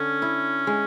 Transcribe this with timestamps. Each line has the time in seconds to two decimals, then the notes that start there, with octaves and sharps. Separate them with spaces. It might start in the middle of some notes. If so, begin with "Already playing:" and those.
Already playing: D3 C#4
0.22 E4
0.67 G#3